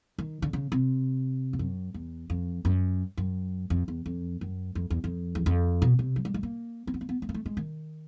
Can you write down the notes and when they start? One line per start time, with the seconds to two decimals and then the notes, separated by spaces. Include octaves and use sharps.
0.19 D#3
0.42 D3
0.53 C#3
0.72 C3
1.53 G2
1.59 F#2
1.94 E2
2.30 F2
2.65 F#2
3.17 F#2
3.70 F2
3.88 E2
4.06 F2
4.41 F#2
4.75 F2
4.90 E2
5.04 F2
5.35 E2
5.46 F2
5.82 B2
5.99 C3
6.16 F#3
6.25 G3
6.34 G#3
6.43 A#3
6.87 C4
6.94 B3
7.01 A#3
7.09 B3
7.22 A3
7.29 A#3
7.34 A3
7.46 G#3
7.57 D#3